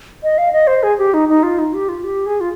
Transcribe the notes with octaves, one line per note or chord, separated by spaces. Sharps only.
D#5
F5
D#5
C5
G#4
G4
D#4
D#4
F4
D#4
G4
F4
G4
G#4
F4